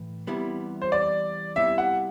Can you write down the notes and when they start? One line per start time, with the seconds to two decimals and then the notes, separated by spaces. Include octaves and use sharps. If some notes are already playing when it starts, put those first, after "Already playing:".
Already playing: A2 E3
0.27 E2 C3 G3 B3 E4
0.82 C5
0.92 D5
1.56 C3 G3 B3 E4 E5
1.78 F#5